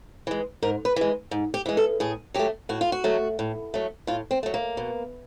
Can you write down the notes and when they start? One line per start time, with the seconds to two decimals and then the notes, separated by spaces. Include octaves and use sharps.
0.27 E3 G#3
0.62 G#2 A#4
0.85 B4
0.96 E3 G#3
1.31 G#2
1.54 G4
1.66 E3 G#3
1.77 A4
2.00 A2 G#4
2.34 F#3 A3 G4
2.69 A2 F#4
2.81 F4
2.92 F#4
3.04 F#3 A3
3.39 A2
3.74 F#3 A3
4.07 A2 F4
4.31 C4
4.43 F#3 A3
4.54 A#3
4.77 B2